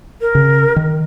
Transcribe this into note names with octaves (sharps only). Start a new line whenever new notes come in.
A#4
C#3
D#3